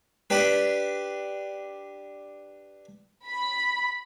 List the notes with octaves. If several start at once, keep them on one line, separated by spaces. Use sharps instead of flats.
D4 G4 B4
B5